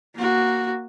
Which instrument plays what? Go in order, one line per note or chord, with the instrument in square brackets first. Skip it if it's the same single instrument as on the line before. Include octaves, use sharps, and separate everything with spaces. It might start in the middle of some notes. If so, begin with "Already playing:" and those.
[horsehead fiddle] A#3 F#4